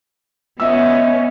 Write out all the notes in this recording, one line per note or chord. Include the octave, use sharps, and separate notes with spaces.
B3 C#4 D#5 E5 E6